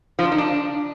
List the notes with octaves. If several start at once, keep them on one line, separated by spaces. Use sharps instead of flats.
F3
D4
D#4
D4